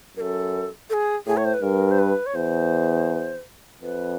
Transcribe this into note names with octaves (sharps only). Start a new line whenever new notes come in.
F#2 A4 A#4
A4
G#4
A2 G#4
C#5
C5
B4
G2 A#4
C5
B4
C#5
E2 C5
F2 B4